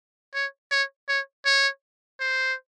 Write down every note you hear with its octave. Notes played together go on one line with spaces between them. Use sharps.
C#5
C#5
C#5
C#5
C5